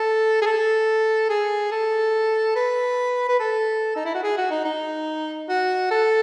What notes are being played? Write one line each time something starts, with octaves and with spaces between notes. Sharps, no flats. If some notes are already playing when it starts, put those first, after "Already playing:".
Already playing: A4
G#4
A4
G#4
A4
B4
B4
A4
D#4
E4
F#4
G#4
F#4
D#4
D#4
F#4
A4